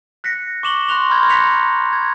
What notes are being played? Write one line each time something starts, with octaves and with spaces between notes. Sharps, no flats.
F#6 A#6 B6 C#7
C#6 D6 E7 F#7 G7
C6 C#6 F#6 A#6 F7 G7
B5 C6 F6 G6 G#6 A#6
A#5 F#6 B6 C#7 F7
G#6